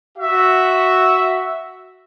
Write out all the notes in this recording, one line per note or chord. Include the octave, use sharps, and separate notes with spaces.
F#4 E5